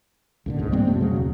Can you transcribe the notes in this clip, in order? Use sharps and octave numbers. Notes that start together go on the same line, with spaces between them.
C#2 A#2 D3
A1 G#2
G3 A#3 C4 C#4
F2 B2 A3
C#3 F#3
D#2